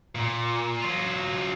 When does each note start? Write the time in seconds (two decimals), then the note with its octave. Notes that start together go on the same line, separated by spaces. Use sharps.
0.15 A#2
0.80 F#3 F4